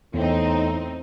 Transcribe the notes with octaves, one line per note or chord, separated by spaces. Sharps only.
E2 A2 C4 D#4